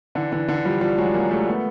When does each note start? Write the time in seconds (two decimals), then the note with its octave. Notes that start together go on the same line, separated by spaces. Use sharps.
0.15 D3 E3
0.32 D3 E3
0.48 D3
0.65 F3 G3
0.81 F3 G3
0.98 F#3 G#3
1.14 G#3 A#3
1.31 G3 A3
1.47 A3 B3